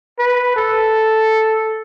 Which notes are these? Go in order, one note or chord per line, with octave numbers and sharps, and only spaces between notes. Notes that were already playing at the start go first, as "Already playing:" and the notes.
B4
A4